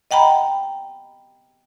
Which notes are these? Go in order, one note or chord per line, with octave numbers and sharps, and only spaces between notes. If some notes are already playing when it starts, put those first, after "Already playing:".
D#5 F#5 G5 A#5 B5